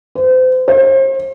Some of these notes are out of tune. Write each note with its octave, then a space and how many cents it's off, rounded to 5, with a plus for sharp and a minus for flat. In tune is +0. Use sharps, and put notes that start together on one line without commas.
C5 -35
C5 +40